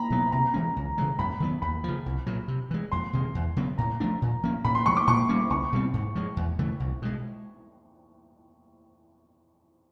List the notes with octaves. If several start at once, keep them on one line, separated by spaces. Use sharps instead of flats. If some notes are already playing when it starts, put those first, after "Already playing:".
Already playing: A#5 B5
B2 F#3 B3
C3 A#5
E3 G#3 C#4
C#2
C#3 E3 G#3
F#2 B5
D#3 F#3 B3
D#2 B5
C#3 F3
C2
A#2 F#3
C3
E3 G#3
F2 C6
C3 D#3 G#3
E2
C#3 F#3 B3
A2 A#5
F3 A3 D4
A#2
F3 A#3 C#4
A2 B5
C6
F3 G#3 C#6
D6
A#2 C#6
G3 A#3 C#4
C#2 C#6
B2 G3 C4
G#2
F3 G#3
E2
C#3 E3 A3
C2
B2 G#3